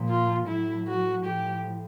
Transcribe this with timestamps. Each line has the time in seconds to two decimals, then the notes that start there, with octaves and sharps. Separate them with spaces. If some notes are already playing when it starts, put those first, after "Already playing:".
Already playing: A#2 F3
0.08 F4
0.46 A2 F#3 E4
0.87 F#4
1.25 A2 F3 G4